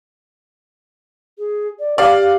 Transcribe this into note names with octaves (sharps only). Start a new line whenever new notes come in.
G#4
D5
G4 D5 F5